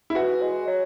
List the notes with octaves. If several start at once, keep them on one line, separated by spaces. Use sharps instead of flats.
E4
E3 F#4
G#3
F#3